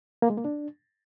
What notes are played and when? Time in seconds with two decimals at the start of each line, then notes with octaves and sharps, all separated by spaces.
0.22 A#3
0.30 G#3
0.37 A#3
0.45 D4